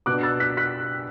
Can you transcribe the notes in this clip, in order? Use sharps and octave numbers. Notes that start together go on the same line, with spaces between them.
B2 B3 D4 D6 F#6
E6 A6
F#6 B6
F#6 B6